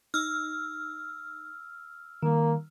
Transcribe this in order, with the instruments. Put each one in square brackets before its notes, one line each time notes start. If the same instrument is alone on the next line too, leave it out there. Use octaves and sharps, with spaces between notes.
[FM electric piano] D#4 [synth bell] E6 F6
[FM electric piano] D#3 G3 [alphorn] A#3